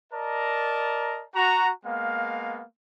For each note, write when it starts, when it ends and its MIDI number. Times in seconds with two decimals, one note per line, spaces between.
0.13 1.24 70
0.13 1.24 74
0.13 1.24 75
0.13 1.24 81
0.13 1.24 82
1.35 1.70 66
1.35 1.70 82
1.85 2.64 56
1.85 2.64 58
1.85 2.64 59
1.85 2.64 77